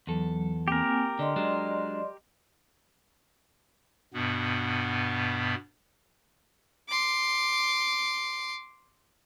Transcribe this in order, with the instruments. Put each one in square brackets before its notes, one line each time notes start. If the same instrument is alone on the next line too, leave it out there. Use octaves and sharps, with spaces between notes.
[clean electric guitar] E2 A4 [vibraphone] F#3
[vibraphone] A#3 C4 G#5 [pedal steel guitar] G4 A#4
[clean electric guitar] D3 [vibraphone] D5 D#5 C6
[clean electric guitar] F#3 G#3 D4
[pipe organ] G2 B2 B3
[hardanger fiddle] C6 D6